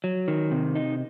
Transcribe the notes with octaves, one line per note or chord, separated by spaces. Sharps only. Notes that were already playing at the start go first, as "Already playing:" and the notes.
F#3
D#3
C3
D#4